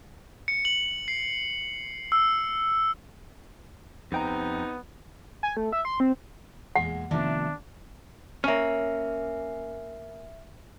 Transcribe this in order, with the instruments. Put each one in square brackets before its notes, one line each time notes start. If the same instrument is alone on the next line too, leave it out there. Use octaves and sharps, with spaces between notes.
[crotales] C#7
F#7
C7
E6
[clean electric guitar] F2 G5 A#5 [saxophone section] C3 D#4 [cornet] B3
[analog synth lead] G#5
A3
E5
C6
C4
[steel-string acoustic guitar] E2 A#2 G#3 [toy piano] F#5
[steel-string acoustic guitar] C3 F3 A3 [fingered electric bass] D#3 B3 [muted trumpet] D4
[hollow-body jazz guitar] A#3 C#4 [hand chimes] E5 F6